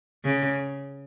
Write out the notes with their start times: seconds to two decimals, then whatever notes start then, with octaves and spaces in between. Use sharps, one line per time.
0.24 C#3